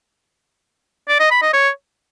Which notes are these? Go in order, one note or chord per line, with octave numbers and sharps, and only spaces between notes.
D5
D#5
B5
D#5
C#5